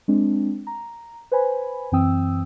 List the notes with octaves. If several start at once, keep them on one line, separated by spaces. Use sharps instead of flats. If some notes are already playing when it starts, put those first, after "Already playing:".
G#3 C4 D4
A#5
B4 C5 G#5 B5
F#2 E3 C4 G5 D#6 E6